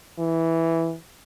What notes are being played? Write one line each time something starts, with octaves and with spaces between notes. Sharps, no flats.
E3